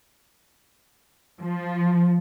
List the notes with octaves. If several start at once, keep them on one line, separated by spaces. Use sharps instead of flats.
F3